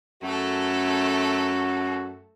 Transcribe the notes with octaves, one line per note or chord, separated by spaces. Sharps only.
F#2 A3 F#4 A4